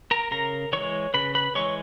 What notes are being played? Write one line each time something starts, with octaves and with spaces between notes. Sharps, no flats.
A#4 A#5
C#3 A#4 A#5
E3 G#3 C#5 C#6
C#3 B4 B5
B4 B5
E3 G#3 C#5 C#6